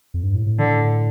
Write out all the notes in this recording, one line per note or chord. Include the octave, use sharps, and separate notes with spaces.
F2
G2
A2
A2
D3